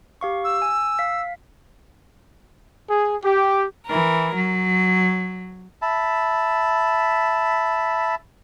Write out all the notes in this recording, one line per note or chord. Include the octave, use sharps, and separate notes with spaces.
G4 F5 C#6
E6
G#5
F5 B6
G#4
G4
E3 A#4
F#3
E5 A5 B5